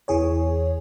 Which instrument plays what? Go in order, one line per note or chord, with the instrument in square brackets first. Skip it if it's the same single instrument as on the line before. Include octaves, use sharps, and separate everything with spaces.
[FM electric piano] E2 E3 G#4 C#5